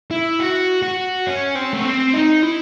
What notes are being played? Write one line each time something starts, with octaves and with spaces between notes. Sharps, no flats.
E4
F#4
F#4
C#4
C4
A3
C4
D#4
E4